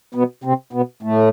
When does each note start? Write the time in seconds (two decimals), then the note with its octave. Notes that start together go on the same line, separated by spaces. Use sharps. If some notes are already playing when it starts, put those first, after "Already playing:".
0.15 B2 B3
0.44 C3 C4
0.73 B2 B3
1.03 A2 A3